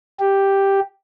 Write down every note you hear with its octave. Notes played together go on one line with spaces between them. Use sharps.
G4